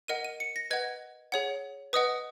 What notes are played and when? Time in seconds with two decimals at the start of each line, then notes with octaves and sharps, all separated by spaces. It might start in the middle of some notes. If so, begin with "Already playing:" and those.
0.08 A#4 D#5 F#5 D#7
0.24 D#7
0.40 C#7
0.56 A#6
0.71 B4 D#5 F#5 G#6
1.32 G#4 C#5 F#5
1.93 B4 D#5 F#5 D#6